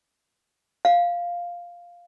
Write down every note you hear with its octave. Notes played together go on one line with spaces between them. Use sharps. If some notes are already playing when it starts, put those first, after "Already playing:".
F5